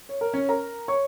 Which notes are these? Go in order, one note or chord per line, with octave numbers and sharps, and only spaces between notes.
C#5
A#4
C#4 C#5
A#4 A#5
C#5 C#6